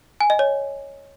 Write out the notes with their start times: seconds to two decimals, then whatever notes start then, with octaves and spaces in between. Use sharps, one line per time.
0.21 G#5
0.30 D#5
0.39 C#5